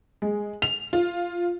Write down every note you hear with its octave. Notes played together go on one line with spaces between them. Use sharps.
G#3
F7
F4